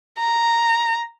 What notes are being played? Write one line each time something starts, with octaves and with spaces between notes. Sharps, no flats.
A#5